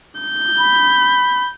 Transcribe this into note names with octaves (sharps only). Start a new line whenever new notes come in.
G6
B5